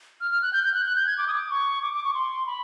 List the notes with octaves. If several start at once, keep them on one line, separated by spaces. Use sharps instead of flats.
F6
F6
F#6
G6
G6
F#6
F#6
G6
G#6
D6
D#6
D6
C#6
D6
D6
C#6
C6
B5